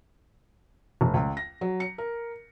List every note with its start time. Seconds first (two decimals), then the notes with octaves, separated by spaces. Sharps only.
1.01 F1
1.14 C#2
1.37 A#6
1.61 F#3
1.80 C#7
1.98 A#4